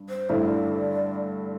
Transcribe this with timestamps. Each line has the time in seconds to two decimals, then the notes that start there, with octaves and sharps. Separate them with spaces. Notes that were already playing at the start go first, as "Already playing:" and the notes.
Already playing: G2
0.09 C5
0.29 G2 D3 A3 E4 D5